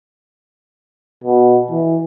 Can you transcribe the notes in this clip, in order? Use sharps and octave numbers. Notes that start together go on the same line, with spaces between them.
B2
E3